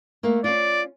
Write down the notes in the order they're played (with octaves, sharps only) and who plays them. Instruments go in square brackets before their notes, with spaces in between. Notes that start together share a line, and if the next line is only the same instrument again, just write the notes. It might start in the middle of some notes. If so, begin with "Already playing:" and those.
[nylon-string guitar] A3 A#3
[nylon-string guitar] C#4 F4 [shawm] D5